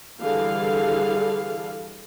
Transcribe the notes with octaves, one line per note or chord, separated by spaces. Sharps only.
D3 E3 G3 G#4 A4 F5